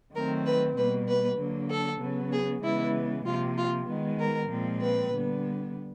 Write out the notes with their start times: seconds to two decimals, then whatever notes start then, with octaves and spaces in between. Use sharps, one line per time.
0.15 D#3 F#3 A3 C4 A#4
0.46 B4
0.77 B2 G3 A#3 B4
1.08 B4
1.39 D3 F#3 A#3
1.70 A4
2.01 C#3 F#3 B3
2.32 G#4
2.64 C#3 E3 G#3 B3 E4
3.26 C3 F3 A#3 F4
3.57 F4
3.88 D#3 G#3 B3
4.19 A#4
4.51 A#2 F3 G#3 C4
4.82 B4
5.13 D3 G3 B3